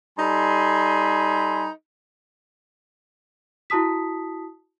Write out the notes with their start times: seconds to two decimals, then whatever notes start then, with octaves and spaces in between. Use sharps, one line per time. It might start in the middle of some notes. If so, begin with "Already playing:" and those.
0.19 G3 D#4 A4 G#5 B5 C6
3.70 E4 F#4 A5 D#6 B6